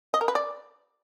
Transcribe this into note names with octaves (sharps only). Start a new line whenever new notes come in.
D#5
A#4
B4
D5